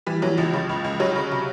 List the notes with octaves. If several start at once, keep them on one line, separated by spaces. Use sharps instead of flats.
E3 G3
E3 F#3
C#2 F3
C#3
C#2
C#2
C#3 F#3
C#3
C3